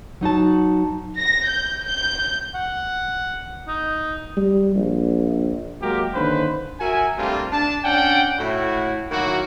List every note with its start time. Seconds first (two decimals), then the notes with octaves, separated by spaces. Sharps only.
0.21 F#3 D#4 F#4 A5
1.18 A#6
1.48 G6
1.86 G6
2.54 F#5
3.68 D#4
4.37 G3
4.76 A#1
5.82 F#3 G#3 A#3 F#4 G4 A#4
6.14 D3 D#3 A#3 C#4 B4 C5
6.80 F#4 A#4 E5 G#5
7.17 G3 A3 A#3 C4 D4 F4
7.52 D4 A5
7.84 C#4 D4 F#5 G5
8.38 A2 E4 F#4
9.11 D#3 F#3 A#3 E4 F#4